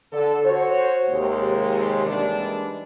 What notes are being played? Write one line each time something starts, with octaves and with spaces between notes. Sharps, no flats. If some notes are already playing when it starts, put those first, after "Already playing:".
D3 A4
F#4 C5 C#5
D#2 C3 G#3
E3 G3 G#3 A#3 D4 D#4